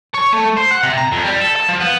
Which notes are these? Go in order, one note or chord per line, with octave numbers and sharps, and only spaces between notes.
C#5
A3
C5
F#5
C3
A#5
F2
G3
A4
A5
F3
B3